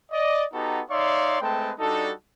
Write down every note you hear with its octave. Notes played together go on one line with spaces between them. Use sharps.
D5 D#5
B3 D#4 F#4 G4 A4 A#5
D#4 C#5 D5 E5 F5 C6
G#3 A3 C4 B4 G5 A5
G3 D4 D#4 F#4 A4